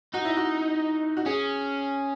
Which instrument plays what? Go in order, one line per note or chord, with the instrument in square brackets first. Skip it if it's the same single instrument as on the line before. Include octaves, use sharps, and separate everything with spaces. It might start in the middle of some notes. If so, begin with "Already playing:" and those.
[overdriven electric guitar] D#4 [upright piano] F#4
[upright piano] E4
F#4
F#4
[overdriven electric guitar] C#4 [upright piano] G#4